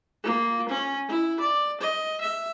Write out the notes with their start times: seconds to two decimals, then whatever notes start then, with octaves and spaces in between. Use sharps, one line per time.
0.23 A#3 F4
0.69 C#4
1.08 E4
1.40 D5
1.81 D#5
2.21 E5